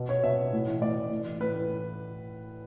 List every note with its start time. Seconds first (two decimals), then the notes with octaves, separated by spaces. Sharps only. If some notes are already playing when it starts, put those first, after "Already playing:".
Already playing: B2
0.09 C#5
0.23 B2 E5
0.53 A2
0.67 E3
0.82 A2 D5
0.97 E3
1.11 A2
1.26 E3
1.40 A2 B4
1.55 E3